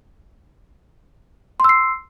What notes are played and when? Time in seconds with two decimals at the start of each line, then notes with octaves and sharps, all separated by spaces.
1.60 C6
1.64 E6
1.69 C7